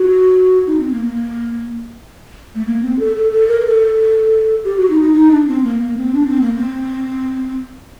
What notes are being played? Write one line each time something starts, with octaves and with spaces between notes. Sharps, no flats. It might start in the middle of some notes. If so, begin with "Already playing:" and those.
Already playing: F#4
D#4
C4
A#3
A#3
A3
A#3
C4
A4
A4
A4
A#4
A#4
A4
G4
F#4
D#4
D#4
D#4
D4
C4
A#3
A#3
C4
D4
C4
A#3
C4